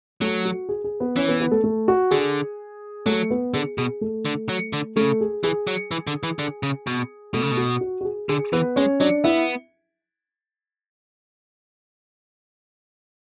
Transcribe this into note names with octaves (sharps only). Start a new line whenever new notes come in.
F#3 A3 A4
F#4
G#4
G#4
B3 B4
E3 C#4 C#5
B3 B4
B3 B4
A3 A4
A3 A4
F#4
D3 G#4
F#3 A3 A4
B3 B4
D3 G#4
B2 G#4
A3 A4
D3
F#3
D3
C#3 A3 A4
G#4
E3 G#4
F#3
E3
D3
E3
D3
C#3
B2
B2 A3 A4
C#3
B2
F#4
F#4
F#4
G#4
D3 G#4
E3 B3 B4
G#3 C#4 C#5
F#3 D4 D5
B3 E4 E5